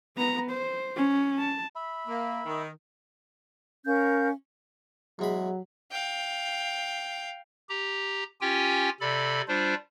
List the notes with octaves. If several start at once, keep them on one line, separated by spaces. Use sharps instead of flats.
B3 A#5
C5
C#4
A5
E5 B5
A#3
D#3
C#4 A#4 F5 G6
E2 F#3 G#3 B5
F5 G5
G4 A#5
C#4 F4 G4 G5 G#5
C3 A4 D5 B5
G3 D4 F4 C5